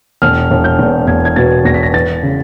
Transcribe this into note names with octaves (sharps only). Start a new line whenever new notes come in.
E1 F6
E1
G6
E2
E2 G#6
G#6
B2 A6
E2 A#6
B6
A#6
E3 A6
C#3